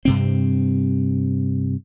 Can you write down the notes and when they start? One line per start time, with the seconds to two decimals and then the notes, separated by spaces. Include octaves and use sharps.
0.05 G2 C3 C4